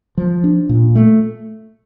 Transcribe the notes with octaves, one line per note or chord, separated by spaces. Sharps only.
F3
D4
A#2
A3